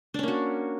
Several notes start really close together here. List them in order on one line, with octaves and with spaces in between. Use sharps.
D4 C#4 A#3 F#4